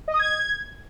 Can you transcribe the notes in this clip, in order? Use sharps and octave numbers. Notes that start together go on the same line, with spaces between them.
D#5
D#6
G#6